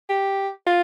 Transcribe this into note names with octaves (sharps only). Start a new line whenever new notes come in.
G4
F4